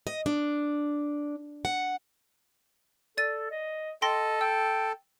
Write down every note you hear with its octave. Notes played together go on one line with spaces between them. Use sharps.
D#5
D4
F#5
A4 D5 A6 D#7
D#5
A4 D#5 G5 C6 A#6
G5 E6